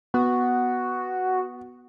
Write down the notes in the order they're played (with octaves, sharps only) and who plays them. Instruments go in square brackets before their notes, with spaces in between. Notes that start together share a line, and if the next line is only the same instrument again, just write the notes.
[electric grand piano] B3 [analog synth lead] F#4